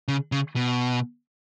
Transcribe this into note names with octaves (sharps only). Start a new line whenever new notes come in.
C#3
C#3
B2